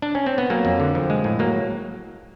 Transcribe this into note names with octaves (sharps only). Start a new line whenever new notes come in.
D4
C#4
C4
B3
F#3 A#3
F2
D3
F3
G#3
A2
F#3 A#3